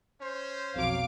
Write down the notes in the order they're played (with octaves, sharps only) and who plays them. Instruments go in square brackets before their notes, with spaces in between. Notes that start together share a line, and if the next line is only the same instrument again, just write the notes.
[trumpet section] C#4 C5
[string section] B1 D6 [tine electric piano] F2 F#3 [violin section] F5